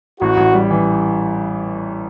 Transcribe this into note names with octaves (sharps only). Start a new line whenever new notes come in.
A1 F#4
A1
G3
E3